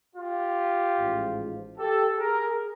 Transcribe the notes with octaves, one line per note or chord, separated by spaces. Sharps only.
F4 G4
A1 G#2 F3
G4 A4
G#4 A#4